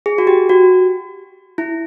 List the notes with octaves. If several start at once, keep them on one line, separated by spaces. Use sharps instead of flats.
G#4
F#4
G4
F#4
E4